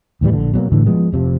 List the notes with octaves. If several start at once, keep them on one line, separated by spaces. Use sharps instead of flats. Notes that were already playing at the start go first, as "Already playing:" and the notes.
D#2 A2 E3 G3
A#1 D3
B2 F#3 G3 A#3
A2 D3 E3 G#3
F3 G#3 B3
F1 C3 F3